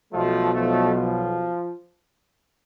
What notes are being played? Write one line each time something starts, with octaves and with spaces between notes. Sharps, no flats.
B1 B2 F3 A3
F3 A3
F3